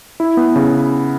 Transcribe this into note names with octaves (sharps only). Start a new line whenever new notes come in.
E4
B3
C#3